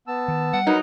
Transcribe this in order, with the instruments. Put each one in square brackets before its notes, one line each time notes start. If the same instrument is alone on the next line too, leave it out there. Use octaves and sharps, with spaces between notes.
[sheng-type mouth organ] B3 A5 E6
[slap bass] D#3
[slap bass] G3 [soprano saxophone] F#5
[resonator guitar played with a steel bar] F#3 D#4 [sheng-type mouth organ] A#4 B4 A#5